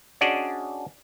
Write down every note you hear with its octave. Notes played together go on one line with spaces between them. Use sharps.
C#4 D4 F#4 G#4 D5 D#5